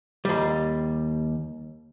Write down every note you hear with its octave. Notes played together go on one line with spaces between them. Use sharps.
D#2 G3